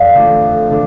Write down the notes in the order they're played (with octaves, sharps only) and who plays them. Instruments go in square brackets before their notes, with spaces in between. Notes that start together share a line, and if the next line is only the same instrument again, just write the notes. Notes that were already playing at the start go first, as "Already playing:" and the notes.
Already playing: [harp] F2 [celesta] D5 F5
[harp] D3 A3 D4 F4
F2
D3 A3 D4